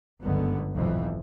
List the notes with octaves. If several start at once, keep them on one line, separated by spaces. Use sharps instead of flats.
G1 C#2 F#2 D3 B3
F1 B1 F2 G#2 E3 F3